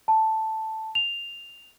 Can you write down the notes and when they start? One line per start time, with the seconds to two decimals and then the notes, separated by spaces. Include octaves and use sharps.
0.08 A5
0.95 F7